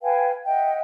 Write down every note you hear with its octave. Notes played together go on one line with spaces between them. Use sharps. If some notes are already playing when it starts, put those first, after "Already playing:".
B4 F5 G5 G#5
D#5 E5 F#5 G5